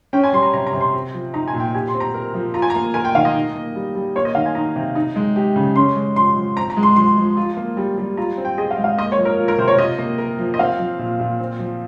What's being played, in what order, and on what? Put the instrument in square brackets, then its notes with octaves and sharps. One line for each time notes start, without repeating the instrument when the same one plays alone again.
[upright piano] C#4 [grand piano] G5
[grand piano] G#5
[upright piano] G3 [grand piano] C6
[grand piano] A#5
[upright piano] C3 [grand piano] A#5
[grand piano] A#5
[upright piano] C3
[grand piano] C6
[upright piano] C4
F3
[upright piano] D#4 [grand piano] A#5
[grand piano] G#5
[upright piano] A#2
[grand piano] G5
[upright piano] G4 [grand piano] G#5
[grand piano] C6
[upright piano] C4
[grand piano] A#5
[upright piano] A#4
F3
[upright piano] F4 [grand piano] A#5
[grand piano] G#5
A#5
[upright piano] A#3
[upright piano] A#4 [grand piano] G#5
[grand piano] G5
[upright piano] D#3 [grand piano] F5
[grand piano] D#5
[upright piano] D#4
A#3
G3
G3
[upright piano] A#3 [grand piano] C#5
[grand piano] D#5
[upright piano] D#3 [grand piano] F5
[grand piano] G#5
[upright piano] D#4 [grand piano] A#5
[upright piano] C3
D#4
G#3
G4
C#3
[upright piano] C#4 [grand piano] C6
[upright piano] G#3
[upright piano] F3 [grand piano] C6
[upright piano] F3
[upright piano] C4 [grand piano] A#5
[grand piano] A#5
[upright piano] G#3
[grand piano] C6
[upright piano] F3 [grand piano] C6
[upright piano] F3
F4
A#3
G3
G3
[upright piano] F4 [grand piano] A#5
[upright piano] C4
[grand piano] G5
[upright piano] G#4 [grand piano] D#5
[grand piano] F5
[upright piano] G#3
[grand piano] F5
[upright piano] A#3 [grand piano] D#5
[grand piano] C#5
[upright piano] F3
[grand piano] A#4
[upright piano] F4
[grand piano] A#4
[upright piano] C3 [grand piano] C5
[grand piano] C#5
[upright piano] F4 [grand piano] D#5
[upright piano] A#3
A#4
F3
[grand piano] D#5
[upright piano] C4 [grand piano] F5
[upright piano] F3
A#2
A#2
C4
F3